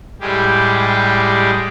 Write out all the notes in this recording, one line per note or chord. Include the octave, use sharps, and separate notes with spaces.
A2 G3 G#3 G4 G#4